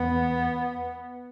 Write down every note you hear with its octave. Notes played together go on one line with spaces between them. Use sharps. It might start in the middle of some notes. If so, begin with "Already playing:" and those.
Already playing: E2 B3